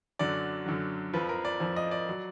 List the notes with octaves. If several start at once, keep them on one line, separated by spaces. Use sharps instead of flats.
F#2 D3 F#3 D5
F#2 D3 F#3
F2 F3 B4
A#4
D5
F2 F3
D#5
D5
F#3